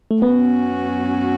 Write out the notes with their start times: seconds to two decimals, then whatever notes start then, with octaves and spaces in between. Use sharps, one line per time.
0.11 A3
0.22 F#2 F#3 B3 C#4 F#4